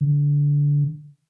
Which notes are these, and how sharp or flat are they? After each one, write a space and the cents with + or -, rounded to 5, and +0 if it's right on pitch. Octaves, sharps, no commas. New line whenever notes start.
D3 -20